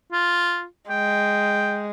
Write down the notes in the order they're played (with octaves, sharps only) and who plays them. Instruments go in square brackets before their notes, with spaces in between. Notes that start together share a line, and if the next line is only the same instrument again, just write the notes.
[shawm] F4
[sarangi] G#3 [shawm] G5